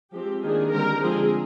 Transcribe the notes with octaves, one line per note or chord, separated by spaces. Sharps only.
F3 G#3 C4 G4
D#3 A#3 D4 G#4
D3 G3 C4 A#4
D3 F3 G#3 C4 G#4